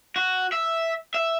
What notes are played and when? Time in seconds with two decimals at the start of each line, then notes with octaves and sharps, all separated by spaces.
0.16 F#4
0.52 E5
1.14 E5